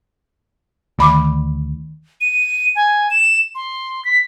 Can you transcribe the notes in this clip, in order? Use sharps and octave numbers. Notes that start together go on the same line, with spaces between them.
D2 D#3 B5 D6
D#7
G#5
E7
C6
B6